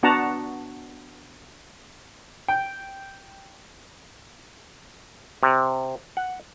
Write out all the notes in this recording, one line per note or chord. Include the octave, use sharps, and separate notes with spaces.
B3 D4 F#4 F#5 A5 A#5
G5
C3
F#5